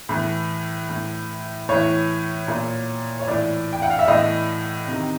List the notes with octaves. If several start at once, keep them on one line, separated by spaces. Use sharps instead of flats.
A2 E3
A2 E3
A2 E3 C#5
A#2
C#5
A2 E3 D5
G5
F#5
F5
E5
A2 E3 D#5
C3 D#3